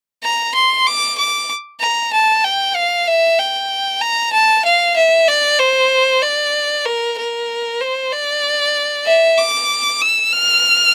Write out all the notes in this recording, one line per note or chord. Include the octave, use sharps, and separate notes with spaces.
A#5
C6
D6
D6
A#5
A5
G5
F5
E5
G5
A#5
A5
F5
E5
D5
C5
D5
A#4
A#4
C5
D5
E5
D6
E6
F6